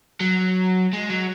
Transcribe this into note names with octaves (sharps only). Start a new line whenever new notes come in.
F#3
G#3
F#3